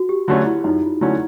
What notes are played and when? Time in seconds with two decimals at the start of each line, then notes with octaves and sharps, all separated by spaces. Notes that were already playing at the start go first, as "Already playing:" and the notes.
Already playing: F#4
0.09 G4
0.28 D3 F#3 A3 C#4 F4
0.46 E4
0.64 F#2 D#4
0.83 F4
1.01 D3 F#3 A3 C#4 E4